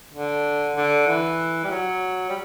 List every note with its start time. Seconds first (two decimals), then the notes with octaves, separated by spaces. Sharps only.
0.13 D3
0.76 D3
1.08 E3
1.64 G3
1.71 F#3
2.29 G3